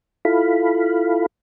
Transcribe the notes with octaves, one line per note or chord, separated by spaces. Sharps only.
E4 F4 A4 F5 B5